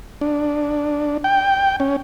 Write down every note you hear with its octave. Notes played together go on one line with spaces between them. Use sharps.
D4
G5
C#4